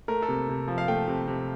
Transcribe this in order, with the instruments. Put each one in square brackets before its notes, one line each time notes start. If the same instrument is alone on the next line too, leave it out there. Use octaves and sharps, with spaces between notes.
[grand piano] A3 A#4
A4
C3
C3
F3
F5
A3 G5
C3
C3